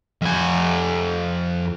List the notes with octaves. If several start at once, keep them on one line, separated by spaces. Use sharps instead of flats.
F2 G#5